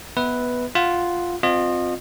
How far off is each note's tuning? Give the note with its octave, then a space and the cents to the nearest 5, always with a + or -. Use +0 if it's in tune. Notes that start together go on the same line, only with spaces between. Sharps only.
B3 -5 B4 +0 E5 -30
F4 +0 F#5 +0
C4 +0 F4 +20 D#5 -20